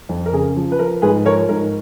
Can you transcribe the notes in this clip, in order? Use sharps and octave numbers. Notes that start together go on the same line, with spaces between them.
F2
A#4
C#3 G#4
F3
B4
F3 A#4
G#2 G#4 B4
F3 A#4 C#5
G#2 A#4